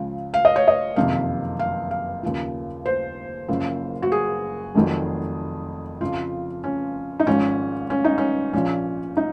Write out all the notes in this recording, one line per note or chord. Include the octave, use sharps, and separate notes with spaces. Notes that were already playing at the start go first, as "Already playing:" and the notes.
Already playing: C#2 C#3 F3
F5
D#5
C#5
D#5
F#1 F2 C3 D#3 F5
F5
F5
D#2 C#3 F3
C5
F#1 F#2 C#3 F3
F#4
G#4
F1 F2 D#3 F#3
F2 C#3 F3 F4
C#4
D#4
G#1 G#2 F3 C#4
C#4
D#4
C#4
A#1 A#2 F3 C#4
D#4